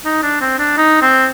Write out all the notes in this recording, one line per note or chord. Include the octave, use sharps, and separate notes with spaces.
D#4
D4
C4
D4
D#4
C4